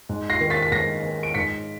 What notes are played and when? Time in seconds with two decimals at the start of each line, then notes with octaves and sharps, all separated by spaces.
0.09 G#2
0.30 A#6 C7
0.40 D#3
0.50 A6 B6
0.62 B6
0.72 G#2 A#6 C7
1.03 D#3
1.23 D7
1.34 G#2 B6 C#7